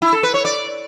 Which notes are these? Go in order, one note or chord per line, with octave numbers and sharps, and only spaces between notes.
E4
A4
B4
C#5
D5